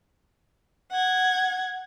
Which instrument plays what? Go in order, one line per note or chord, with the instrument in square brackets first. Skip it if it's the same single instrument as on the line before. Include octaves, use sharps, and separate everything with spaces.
[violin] F#5 G#6